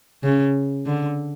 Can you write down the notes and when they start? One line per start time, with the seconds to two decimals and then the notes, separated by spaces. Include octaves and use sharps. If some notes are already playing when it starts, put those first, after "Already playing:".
0.24 C#3
0.86 D3